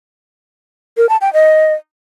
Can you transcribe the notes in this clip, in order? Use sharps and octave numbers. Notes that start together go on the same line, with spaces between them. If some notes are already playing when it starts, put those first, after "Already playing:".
A#4
A5
G5
D#5